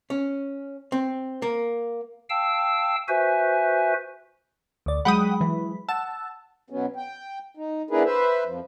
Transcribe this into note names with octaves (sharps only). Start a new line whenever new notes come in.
C#4
C4
A#3
F5 G5 A5 E6
F#4 B4 C5 E5 G#5
D2 D5
F#3 G#3 F#5 G5 B5 D#6
E3
F#5 A5 E6
B2 F#3 B3 C#4
G5
D#4
B3 D4 E4 G#4 A#4 B4
B4 C5 E5
F2 F3